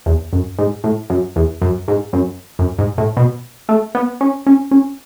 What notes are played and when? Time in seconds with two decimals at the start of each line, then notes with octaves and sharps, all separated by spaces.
0.06 E2
0.33 F#2
0.59 G#2
0.84 A2
1.10 F#2
1.36 E2
1.61 F#2
1.88 G#2
2.13 F#2
2.59 F#2
2.78 G#2
2.98 A2
3.17 B2
3.69 A3
3.95 B3
4.21 C#4
4.47 C#4
4.71 C#4